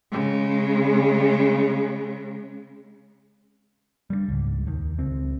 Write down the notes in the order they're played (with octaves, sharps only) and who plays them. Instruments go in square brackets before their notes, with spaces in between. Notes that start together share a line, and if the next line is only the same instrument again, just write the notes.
[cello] C#3 G#3
[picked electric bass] G3 A3 D4
C#2 G#2
D#2 D#3
C#2 C4